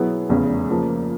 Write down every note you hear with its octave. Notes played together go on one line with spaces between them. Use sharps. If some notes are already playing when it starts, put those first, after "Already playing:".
Already playing: B2 F#3 B3 E4 G#4
F1 E2 C#3
C#3 F3 A#3